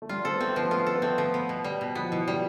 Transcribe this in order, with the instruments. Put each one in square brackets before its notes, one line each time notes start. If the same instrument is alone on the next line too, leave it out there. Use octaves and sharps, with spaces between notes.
[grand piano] A3
[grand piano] G3 [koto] F4
[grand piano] C4 [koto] A4
[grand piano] B3
[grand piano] A3 [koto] C4
[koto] F3 [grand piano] B3
[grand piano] A3 [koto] F4
[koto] A4
[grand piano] B3
[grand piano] A3 [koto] C4
[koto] F3
B3
B2
G3
B2
[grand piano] F3 [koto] B3
[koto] B2 [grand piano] E3
[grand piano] F3 [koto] G3